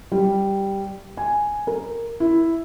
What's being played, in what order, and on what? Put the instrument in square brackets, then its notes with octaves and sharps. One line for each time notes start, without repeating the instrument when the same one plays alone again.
[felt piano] G3
G#5
A#4
E4